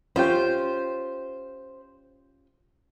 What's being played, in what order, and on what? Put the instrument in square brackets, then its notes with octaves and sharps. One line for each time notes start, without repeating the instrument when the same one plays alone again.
[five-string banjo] C#4 F4 G4 [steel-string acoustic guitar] C5